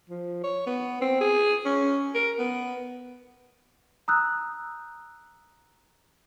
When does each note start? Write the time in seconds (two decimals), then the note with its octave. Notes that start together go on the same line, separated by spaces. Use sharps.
0.09 F3
0.44 C#5
0.67 B3
1.01 C4
1.20 G#4
1.65 C#4
2.15 A#4
2.39 B3
4.08 A#5 D#6 E6 F#6 G6